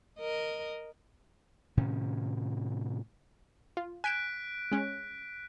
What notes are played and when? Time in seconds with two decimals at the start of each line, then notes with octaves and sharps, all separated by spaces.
0.20 A#4 D#5
1.77 A2 C3 D#3 C#4
3.77 F4
4.04 G#5 F#6 G6 B6 D7 E7
4.72 G#3 C#4